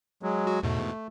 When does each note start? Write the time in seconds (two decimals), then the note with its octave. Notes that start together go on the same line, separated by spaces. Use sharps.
0.23 F#3 G#3
0.47 F#4
0.63 E2 G#2 B2 A3